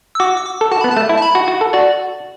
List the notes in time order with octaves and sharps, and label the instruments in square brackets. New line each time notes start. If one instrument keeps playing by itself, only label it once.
[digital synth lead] E6
[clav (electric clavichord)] F#4 [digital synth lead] D6
[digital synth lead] E6
D6
[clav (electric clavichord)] A4
[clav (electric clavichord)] F#4 [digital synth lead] A5
[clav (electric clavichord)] B3 [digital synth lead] B5
[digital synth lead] A5
[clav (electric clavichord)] A3
E4
[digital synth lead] A5
B5
[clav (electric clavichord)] F#4
F#4
A4
[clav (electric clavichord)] F#4 [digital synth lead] D5